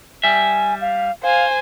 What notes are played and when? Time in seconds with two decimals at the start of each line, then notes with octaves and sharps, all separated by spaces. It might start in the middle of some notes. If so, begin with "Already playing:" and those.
0.23 G3 E5 G#5
0.81 F5
1.23 C5 F5 G#5